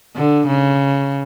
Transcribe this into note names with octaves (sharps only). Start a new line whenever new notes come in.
D3
C#3